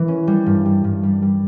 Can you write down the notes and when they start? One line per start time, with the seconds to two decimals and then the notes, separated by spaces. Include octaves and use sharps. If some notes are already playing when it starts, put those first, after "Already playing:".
Already playing: E3
0.08 C#4
0.27 G3
0.46 G2
0.65 G3
0.84 G2
1.03 G3
1.22 G3